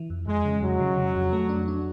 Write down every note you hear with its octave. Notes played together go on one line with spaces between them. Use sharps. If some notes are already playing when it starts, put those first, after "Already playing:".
Already playing: E3
F2
F2 G#3
C#3
F2 F#3
C#3
C#3
F2
A3
D4
D4